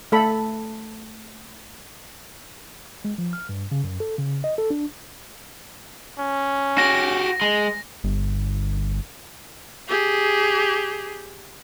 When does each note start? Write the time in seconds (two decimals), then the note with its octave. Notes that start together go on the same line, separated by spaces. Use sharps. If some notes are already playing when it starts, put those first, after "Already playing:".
0.12 A3 A4 B5
3.04 G#3
3.18 F3
3.33 F6
3.49 G2
3.71 C#3
3.84 F#2
4.00 A4
4.18 C#3
4.44 D#5
4.58 A4
4.70 D4
6.19 C#4
6.78 F#4 G4 A#6
7.41 G#3
8.04 G1
9.88 G4 G#4